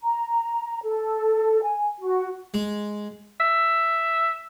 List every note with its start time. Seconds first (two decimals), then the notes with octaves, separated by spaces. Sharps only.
0.01 A#5
0.84 A4
1.63 G#5
2.00 F#4
2.54 G#3
3.40 E5